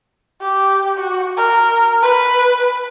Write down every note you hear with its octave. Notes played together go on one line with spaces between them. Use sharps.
G4
F#4
A#4
B4